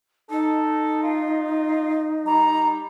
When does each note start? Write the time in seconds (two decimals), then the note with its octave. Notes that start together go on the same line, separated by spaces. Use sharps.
0.30 D#4 A4
1.03 F4
2.26 G3 A#5